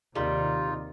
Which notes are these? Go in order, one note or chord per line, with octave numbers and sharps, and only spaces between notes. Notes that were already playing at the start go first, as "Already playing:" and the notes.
D#2 C3 D#3 G3 D#4 F4